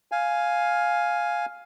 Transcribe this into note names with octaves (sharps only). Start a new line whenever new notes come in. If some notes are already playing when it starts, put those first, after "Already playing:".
F5 G#5